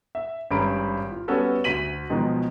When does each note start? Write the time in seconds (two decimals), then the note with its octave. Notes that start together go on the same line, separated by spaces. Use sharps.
0.15 E5
0.51 G#1 G2 C#4 A#5 B5 D7
1.11 F4
1.28 G3 B3 C#4 F#4 A4 B4
1.64 D2 F#4 B6 D#7 F#7
2.10 G#2 B2 D#3 F3 F#3 G#3